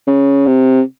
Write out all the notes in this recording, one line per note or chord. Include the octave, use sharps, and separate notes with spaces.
C#3
C3